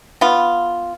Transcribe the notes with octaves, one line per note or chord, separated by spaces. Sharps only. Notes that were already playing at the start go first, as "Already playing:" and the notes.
B3 F4